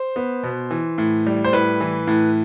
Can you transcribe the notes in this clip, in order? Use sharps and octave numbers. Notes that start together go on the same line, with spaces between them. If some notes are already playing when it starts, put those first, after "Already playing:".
Already playing: C5
B3
B2
E3
A2
G3
C5
A2 B4
E3
A2